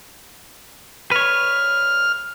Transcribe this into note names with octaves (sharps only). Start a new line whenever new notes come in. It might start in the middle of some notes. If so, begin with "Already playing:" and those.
B4 C#5 F6